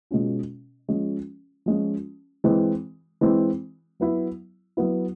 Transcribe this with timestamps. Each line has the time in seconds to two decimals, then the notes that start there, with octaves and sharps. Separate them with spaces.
0.11 B2 G#3 C#4 F4
0.89 F3 G#3 C#4 F4
1.66 F3 G#3 C#4 F4
2.44 E3 G#3 C4 E4
3.21 E3 G#3 C4 E4
4.00 F#3 B3 E4
4.77 F#3 B3 E4